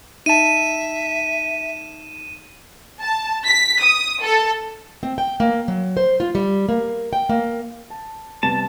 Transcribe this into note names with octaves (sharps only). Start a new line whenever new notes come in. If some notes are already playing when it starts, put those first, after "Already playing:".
D#4 E5 A5 D#7 E7
A5
B6
D#6
A4
C4
G5
A#3
F#3
C5
F4
G3
A#3
G5
A#3
A5
C3 G3 B3 A5